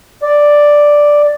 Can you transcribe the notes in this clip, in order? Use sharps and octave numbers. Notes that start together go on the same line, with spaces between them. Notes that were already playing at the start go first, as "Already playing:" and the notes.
D5